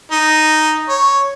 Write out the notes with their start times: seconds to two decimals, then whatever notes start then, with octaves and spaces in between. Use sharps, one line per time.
0.12 D#4
0.89 C#5